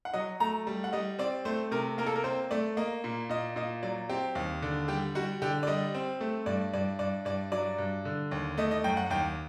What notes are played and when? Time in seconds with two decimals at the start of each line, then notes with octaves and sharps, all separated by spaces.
0.05 F#5
0.14 F#3 D#5
0.40 A3 A#5
0.67 G3
0.84 F#5
0.93 G3 D#5
1.19 C4 D5
1.45 A3 C5
1.71 C3 A#4
1.98 A#3 A#4
2.07 A4
2.16 A#4
2.24 C4 C5
2.51 A3 D5
2.77 A#3 D#5
3.04 A#2
3.29 A#2 D#5
3.56 A#2 D#5
3.83 F#3 D5
4.09 C4 G4
4.35 D#2
4.62 D3
4.88 G3 G4
5.15 G3 F#4
5.42 D3 G4
5.63 D5
5.67 G3 D#5
5.94 C4
6.21 A3
6.46 G2 D5
6.73 G2 D5
6.99 G2 D5
7.25 G2 D5
7.52 F#3 D5
7.78 G2
8.05 D3
8.31 D#2
8.57 A3 D#5
8.71 D#5
8.84 F#2 G5
8.97 F#5
9.10 D#2 G5